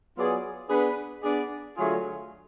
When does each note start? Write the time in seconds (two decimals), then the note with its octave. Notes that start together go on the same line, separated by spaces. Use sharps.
0.16 F#3 B3 F4 G#4 D5
0.69 B3 D4 G#4 B4
1.23 B3 D4 G#4 D5
1.76 D3 F#3 A3 F4 G#4